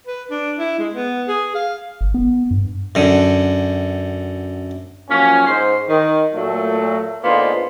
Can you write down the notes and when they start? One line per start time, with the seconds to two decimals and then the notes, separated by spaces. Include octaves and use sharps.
0.07 B4
0.30 D4
0.59 E4
0.79 G#3
0.94 B3
1.28 G#4
1.55 F5
2.01 G1
2.14 B3
2.51 G2
2.95 F#2 D3
5.10 F3 F#3 A#3 C#4
5.47 G#2 C5
5.89 D#3
6.34 A#2 F#3 A3
7.24 G#2 D3 A#3 B3 F4 C5